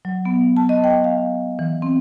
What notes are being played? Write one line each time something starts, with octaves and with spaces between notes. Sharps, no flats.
F#3
B3
A5
D#5
G5
F5
E3
C4